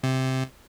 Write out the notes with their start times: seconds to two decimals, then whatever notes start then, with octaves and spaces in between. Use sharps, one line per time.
0.03 C3